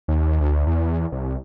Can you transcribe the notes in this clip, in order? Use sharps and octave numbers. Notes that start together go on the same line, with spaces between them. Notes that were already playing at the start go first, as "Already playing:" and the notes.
D#2
D2
E2
C2